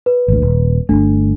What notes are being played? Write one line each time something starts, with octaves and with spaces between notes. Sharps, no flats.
B4
G#1 D2
D#1
G1 F2 A3 D4